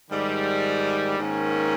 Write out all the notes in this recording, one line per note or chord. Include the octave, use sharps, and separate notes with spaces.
G#2 D#3 G3
G#2 D#3 A#3 C#4